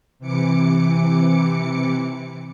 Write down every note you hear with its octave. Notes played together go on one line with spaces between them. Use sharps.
C3 E3 D6 C#7